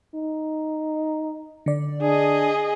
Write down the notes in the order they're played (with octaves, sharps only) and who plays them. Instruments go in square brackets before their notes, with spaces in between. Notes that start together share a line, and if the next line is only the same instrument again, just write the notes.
[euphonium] D#4
[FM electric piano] D3 D5
[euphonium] D4 [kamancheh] G#4 D#5